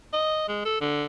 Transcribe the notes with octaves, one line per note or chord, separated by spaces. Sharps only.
D#5
G#3
A4
D3